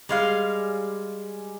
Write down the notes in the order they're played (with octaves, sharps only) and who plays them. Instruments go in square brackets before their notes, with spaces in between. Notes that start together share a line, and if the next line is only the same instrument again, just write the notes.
[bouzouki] G3 G#3 F5